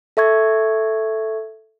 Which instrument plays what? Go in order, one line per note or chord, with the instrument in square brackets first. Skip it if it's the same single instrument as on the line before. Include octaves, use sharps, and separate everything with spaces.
[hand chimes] A4 E5 C#6 G#6